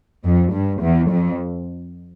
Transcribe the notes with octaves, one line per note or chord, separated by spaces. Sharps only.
F2
G2
E2
F2